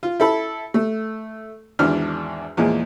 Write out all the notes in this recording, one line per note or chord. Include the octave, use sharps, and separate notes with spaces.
F4
E4 A4 B5
A3
G#1 E2 D4 F6
E2 A#2 F3 G#3